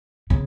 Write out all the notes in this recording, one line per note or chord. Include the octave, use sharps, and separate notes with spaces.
C#3